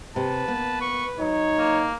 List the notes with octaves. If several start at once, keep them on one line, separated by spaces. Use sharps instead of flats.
C3 B4 A5
A#3 B3
C#6
F#3 D#4 C#5
A#3